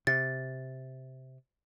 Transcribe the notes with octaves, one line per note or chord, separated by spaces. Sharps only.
C3 A6